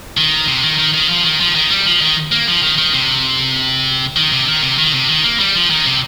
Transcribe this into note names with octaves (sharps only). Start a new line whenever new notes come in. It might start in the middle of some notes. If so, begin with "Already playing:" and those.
D#3
C3
D#3
D#3
D#3
F3
D#3
F3
D#3
G3
F3
D#3
A#3
F3
D#3
D#3
C3
D#3
C3
D#3
C3
D#3
C3
D#3
A#3
G3
F3
D#3
C3